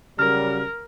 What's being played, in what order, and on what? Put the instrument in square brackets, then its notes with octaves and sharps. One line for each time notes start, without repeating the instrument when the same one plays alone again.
[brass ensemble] C#3 F#3 G3 [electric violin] A#4 [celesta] F6